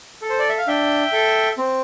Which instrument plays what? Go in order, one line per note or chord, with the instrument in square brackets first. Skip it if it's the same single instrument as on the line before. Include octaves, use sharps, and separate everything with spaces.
[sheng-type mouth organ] A4
C5
D5
E5
F5
D4 E5 G5
A4
C4